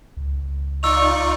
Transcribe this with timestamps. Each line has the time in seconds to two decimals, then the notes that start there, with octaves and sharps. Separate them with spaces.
0.17 C#2
0.83 D#4 F4 D5 C#6 E6 F7